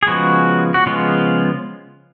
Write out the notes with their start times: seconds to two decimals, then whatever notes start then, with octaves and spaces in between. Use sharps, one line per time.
0.03 G#4
0.07 C#3 F3 G#3 B3 F#4
0.74 F#4
0.86 C#3 F3 G#3 B3 F4